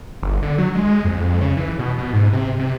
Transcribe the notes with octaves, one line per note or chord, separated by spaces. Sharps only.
G1
D3
F#3
G#3
F2
C#3
E3
B2
B2
G#2
C3
C3